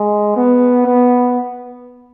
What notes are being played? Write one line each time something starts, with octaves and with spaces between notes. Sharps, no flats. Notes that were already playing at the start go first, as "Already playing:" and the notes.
Already playing: G#3
B3
B3